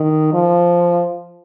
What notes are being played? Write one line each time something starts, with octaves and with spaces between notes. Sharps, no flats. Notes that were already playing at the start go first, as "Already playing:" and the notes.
Already playing: D#3
F3